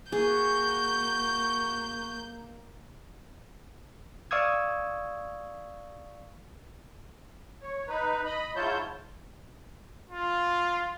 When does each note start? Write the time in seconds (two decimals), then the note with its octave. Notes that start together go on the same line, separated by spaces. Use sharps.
0.12 A#3 F#4 G#4 G6
4.31 D5 F5 C#6 D#6 E6 G#6
7.62 C#5
7.88 D#4 B4
8.25 D#5 B5
8.56 G#2 E4 F4 C#5 A5 G6
10.10 F4